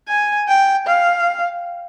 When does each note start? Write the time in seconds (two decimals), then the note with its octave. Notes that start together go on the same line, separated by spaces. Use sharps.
0.09 G#5
0.48 G5
0.87 F5